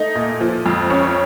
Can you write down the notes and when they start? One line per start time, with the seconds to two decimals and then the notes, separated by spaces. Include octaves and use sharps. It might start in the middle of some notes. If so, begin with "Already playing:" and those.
Already playing: A3 D#4
0.15 A#2
0.41 F3
0.66 F2
0.90 C#4